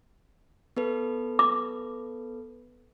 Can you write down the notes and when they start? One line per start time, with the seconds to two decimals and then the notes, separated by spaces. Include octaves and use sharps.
0.77 B3 A4 B4
1.39 D6